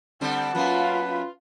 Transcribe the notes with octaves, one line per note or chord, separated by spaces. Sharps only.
D3 G3 C4 F#5 A5
F#2 A#3 B3 F4 B4
F4